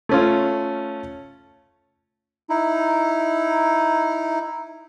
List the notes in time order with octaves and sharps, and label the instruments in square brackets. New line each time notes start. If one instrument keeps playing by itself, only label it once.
[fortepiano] A3 C#4 F4
[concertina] D#4 E4